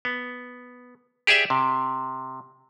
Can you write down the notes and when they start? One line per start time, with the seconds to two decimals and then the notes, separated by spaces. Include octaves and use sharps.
0.05 B3
1.27 G4 G#4 D5 E5 G#5
1.50 C3